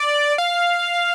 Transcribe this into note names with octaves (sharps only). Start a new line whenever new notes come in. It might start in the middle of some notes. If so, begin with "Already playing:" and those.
Already playing: D5
F5